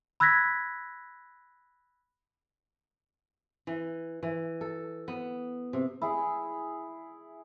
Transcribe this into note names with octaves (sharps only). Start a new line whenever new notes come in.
B5 E6 F#6 G#6 A#6 B6
E3
E3
A4
B3
C3
E4 G#4